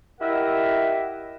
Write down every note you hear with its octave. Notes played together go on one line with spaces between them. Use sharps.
E4 G4 A#4 D#5 E5 F#5